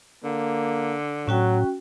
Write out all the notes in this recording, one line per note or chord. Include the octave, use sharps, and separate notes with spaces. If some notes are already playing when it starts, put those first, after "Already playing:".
D3 A#3
A2 F#3 C#4 F#4 G5